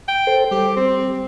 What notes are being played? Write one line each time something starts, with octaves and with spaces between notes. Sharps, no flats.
G5
A4 C5
G3 G4
C4